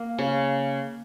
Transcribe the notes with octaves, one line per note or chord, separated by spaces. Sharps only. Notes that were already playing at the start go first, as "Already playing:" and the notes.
Already playing: A#3
C#3